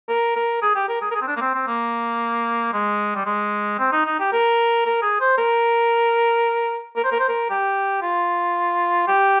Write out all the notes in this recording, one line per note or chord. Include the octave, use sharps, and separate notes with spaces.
A#4
A#4
G#4
G4
A#4
G#4
A#4
G#4
C4
D4
A#3
C4
C4
A#3
G#3
G3
G#3
C4
D#4
D#4
G4
A#4
A#4
G#4
C5
A#4
A#4
C5
A#4
C5
A#4
G4
F4
G4